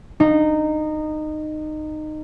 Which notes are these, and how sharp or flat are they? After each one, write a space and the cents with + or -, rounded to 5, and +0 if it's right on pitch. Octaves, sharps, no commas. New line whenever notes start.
D#4 -20